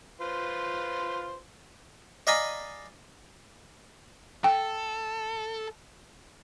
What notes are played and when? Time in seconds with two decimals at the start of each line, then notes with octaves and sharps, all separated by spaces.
0.21 F4 B4 C5
2.27 D5 D#5 F5 G#5 A#5 B5
4.44 A4 G5